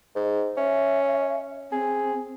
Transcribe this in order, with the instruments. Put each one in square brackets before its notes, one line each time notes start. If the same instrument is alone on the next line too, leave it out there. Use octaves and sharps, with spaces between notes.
[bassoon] G#2
[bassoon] C#4 [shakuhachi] E5
[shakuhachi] C4 [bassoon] G#4